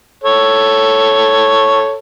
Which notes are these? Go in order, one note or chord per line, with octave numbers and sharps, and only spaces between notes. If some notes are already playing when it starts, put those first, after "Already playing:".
A4 C#5